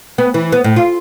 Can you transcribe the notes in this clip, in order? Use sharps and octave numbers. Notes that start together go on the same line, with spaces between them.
B3
E3
B3
A2
F4